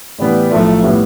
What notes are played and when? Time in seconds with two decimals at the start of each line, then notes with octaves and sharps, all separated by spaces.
0.19 A2 E3 G3 B3
0.51 B1 A2 F3 A3
0.83 A2 G3 B3